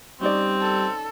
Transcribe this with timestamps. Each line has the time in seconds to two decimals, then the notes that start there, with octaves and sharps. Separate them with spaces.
0.21 G3 C4 C#4 D#4 D5
0.61 A4